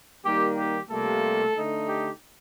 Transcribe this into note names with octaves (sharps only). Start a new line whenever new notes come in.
D#3 G3 A#3 G4
G4
C3 G3 A3 A#3 F4 A4
D3 A3 D#4
G4